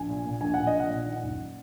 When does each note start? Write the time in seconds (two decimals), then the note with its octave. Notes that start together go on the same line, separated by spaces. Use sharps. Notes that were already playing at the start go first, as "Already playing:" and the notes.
Already playing: A#1 G#5
0.09 A#2
0.25 A#2
0.41 A#1 G#5
0.54 A#1 F#5
0.67 D#5
0.74 A#2
0.80 F#5
0.90 A#2
1.06 D#3
1.23 F#1